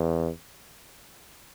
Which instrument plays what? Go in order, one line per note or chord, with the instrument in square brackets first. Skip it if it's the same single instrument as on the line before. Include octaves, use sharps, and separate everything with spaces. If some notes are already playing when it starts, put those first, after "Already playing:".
Already playing: [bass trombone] E2